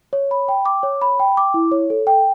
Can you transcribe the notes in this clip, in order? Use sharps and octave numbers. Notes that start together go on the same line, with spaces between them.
C#5
B5
G5
D6
C#5
B5
G5
D6
E4
C#5
A4
G5